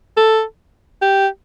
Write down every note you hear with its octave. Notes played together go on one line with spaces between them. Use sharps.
A4
G4